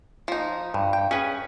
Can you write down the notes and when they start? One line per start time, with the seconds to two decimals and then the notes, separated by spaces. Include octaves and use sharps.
0.28 F3 D#4
0.74 G2
0.93 G5
1.11 C#4 G#4 B4